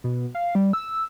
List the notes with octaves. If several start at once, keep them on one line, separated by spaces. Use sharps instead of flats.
B2
F5
G3
E6